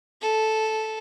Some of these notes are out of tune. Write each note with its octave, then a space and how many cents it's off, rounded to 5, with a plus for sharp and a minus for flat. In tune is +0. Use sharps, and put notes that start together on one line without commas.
A4 -10